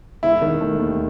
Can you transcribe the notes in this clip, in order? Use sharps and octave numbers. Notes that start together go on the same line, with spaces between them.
E1 E4
D#3
A3
D#2